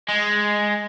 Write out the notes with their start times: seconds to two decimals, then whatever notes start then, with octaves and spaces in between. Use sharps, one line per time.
0.09 G#3